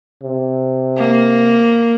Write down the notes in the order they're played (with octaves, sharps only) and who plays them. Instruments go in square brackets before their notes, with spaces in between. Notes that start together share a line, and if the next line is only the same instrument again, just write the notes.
[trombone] C3
[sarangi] A#3